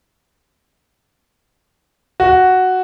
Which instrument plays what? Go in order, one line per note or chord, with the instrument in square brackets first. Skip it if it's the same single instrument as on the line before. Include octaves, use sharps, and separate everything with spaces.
[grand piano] F#4